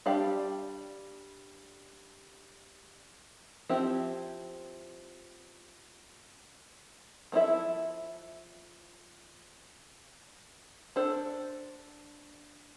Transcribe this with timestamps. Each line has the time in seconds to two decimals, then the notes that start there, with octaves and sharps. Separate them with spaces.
0.06 G3 D4 G4 D5 F5
3.69 F3 C4 E4 G4
7.32 F3 B3 E4 A4 E5
10.96 D4 A4 C5